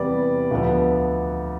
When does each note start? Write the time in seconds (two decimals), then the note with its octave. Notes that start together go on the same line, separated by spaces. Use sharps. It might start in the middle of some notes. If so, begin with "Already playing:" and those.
Already playing: E2 C3 G3 B3 B4 D5
0.51 D2 D3 F3 B3